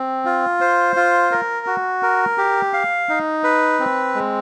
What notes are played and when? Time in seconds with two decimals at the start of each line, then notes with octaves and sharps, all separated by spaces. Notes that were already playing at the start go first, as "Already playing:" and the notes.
Already playing: C4
0.25 F4
0.61 C5
0.96 F4
1.31 A#4
1.67 F#4
2.03 A#4
2.38 G4
2.73 F5
3.09 D#4
3.44 B4
3.80 C4
4.15 G#3